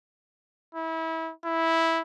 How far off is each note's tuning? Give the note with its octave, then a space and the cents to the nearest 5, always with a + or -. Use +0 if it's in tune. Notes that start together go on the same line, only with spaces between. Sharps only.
E4 -25
E4 -10